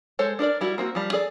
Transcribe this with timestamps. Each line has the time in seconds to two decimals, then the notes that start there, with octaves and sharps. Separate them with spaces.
0.19 G#3 A4 C5 C#5
0.39 D4 A#4 C5 D5
0.61 G3 E4 F#4
0.78 A#3 C4 F#4
0.95 F3 G3
1.13 G#4 A4 D5